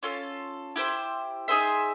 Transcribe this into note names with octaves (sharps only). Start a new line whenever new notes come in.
C#4 F4 A4
E4 G4 C5
D#4 G#4 C5 E5